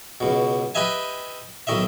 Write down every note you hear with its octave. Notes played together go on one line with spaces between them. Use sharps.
C#2 B2
G4 B4 D#5 E5 G#5
B1 D#3 D#5 E5